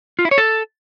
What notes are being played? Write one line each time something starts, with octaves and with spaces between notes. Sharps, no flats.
F4
E4
C#5
A4